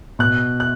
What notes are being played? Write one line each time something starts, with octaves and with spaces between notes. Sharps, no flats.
B2 F#6
F#6